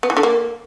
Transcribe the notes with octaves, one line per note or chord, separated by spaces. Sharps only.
B3
E3
D3
A#3